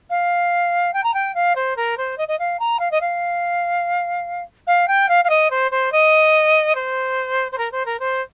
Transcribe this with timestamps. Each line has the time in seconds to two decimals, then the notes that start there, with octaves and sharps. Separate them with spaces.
0.10 F5
0.93 G5
1.03 A#5
1.14 G5
1.34 F5
1.55 C5
1.76 A#4
1.97 C5
2.18 D#5
2.28 D#5
2.39 F5
2.59 A#5
2.79 F5
2.91 D#5
3.01 F5
4.67 F5
4.88 G5
5.09 F5
5.24 F5
5.29 D#5
5.50 C5
5.71 C5
5.92 D#5
6.75 C5
7.52 C5
7.58 A#4
7.71 C5
7.85 A#4
7.99 C5